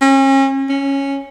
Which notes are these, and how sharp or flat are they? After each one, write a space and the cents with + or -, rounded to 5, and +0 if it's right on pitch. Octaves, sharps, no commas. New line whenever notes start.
C#4 -35
C#4 -5